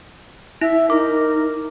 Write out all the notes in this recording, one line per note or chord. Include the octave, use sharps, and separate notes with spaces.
E4 E5
D#4 A#4 D6